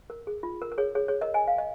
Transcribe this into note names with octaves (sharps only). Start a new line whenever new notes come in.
A#4
G#4
F4
A#4
A#4
G#4 C#5
G#4 C#5
G#4 C#5
A#4 D#5
D#5 G#5
F5
D#5